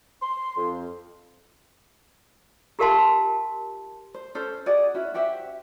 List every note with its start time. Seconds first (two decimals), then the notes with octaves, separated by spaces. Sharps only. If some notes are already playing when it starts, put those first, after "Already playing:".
0.22 C6
0.57 F2
2.79 F4 G4 A#4 F5 A5 C6
4.14 C5
4.35 C#4 A4 C5
4.66 F#4 G#4 D5 D#5
4.95 C#4 E4 F#4
5.14 F#4 G4 C5 E5